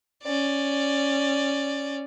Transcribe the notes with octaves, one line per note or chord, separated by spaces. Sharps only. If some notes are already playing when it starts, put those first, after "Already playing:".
C#4 D5